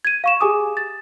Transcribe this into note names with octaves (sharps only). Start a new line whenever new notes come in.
G#6 D#7
F5 C#6 E7
G4 G#4 G#5 D6 D#6
A6